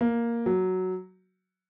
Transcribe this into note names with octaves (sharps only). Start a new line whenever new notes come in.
A#3
F#3